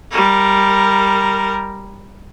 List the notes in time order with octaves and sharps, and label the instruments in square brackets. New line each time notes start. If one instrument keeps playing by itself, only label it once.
[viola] G3 A#4